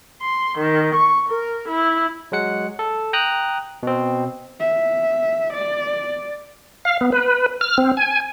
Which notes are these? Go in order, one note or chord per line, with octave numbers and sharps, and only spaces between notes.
C6
D#3
C#6
A#4
E4
F#3 G#3 F#5 C#7
A4
G5 A#5 D#6 F#6
B2 C4
E5
D5
F5
B3
B4
F6
C4
G#5